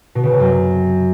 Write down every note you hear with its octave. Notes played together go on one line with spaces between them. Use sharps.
B2
C#3
C3
F#2